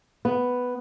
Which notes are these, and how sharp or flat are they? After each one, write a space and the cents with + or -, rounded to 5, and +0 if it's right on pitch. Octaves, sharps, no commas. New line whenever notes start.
B3 +5